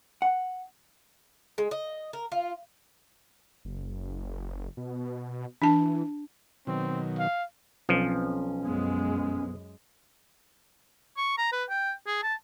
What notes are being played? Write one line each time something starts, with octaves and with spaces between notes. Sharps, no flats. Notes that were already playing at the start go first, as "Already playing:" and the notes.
F#5
G#3
D#5
A#4
F4
F#1
B2
E3 D4 A5
B2 D#3 F#3 C4
F5
B1 F3 C4 C#4
F#2 G#3 B3
C#6
A#5
B4
G5
G#4
A5